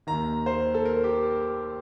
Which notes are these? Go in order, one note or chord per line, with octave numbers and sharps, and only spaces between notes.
D#2 D#3 A#5
C5
A4
A#4
G4